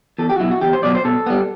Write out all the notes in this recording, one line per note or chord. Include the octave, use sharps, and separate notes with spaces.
E2 A4
G4
F#4
B2 F#3 E4
F#4
E2 G4
C5
B2 F#3 D5
C5
B2 A4
G3 B3